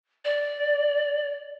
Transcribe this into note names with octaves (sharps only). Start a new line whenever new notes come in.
D5